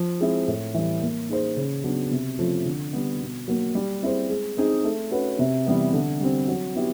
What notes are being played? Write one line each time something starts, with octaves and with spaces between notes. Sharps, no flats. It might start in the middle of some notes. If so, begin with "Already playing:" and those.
Already playing: F3
G#3 C4 E4
A2
E3 G3
A#3
D#4 G#4 C5
C#3
F#3 B3 D4 F#4
C3
F3 A3 C#4 F4
D3
G3 B3
B2
F#3 A#3
G3
C4 E4 G#4 C5
G#3
C4 D#4 G#4
A3
C#4 F#4 B4
C3
E3 G3 B3
D3
G3 C4
F#3
B3 E4 G4